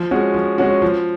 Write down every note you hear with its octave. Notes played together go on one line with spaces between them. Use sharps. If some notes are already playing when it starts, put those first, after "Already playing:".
Already playing: F3
G#3 C#4 F#4
F3
G#3 C#4 F#4
F3